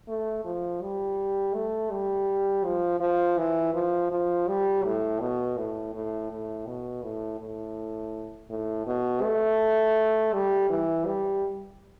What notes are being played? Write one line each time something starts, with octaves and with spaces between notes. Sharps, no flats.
A3
F3
G3
A3
G3
F3
F3
E3
F3
F3
G3
A2
B2
A2
A2
A2
B2
A2
A2
A2
B2
A3
G3
E3
G3